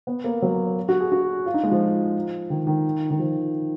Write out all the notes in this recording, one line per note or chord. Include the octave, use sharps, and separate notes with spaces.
B3
A#3
F#3
F#4
G#4
F#4
F4
D#4
G#3
F3
D#3
D#3
D#3
F3